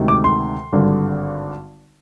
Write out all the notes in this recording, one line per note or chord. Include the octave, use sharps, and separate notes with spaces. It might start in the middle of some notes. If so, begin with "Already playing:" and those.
Already playing: D2 C3 D#3 G#3
D6
C6
G#1 G2 D3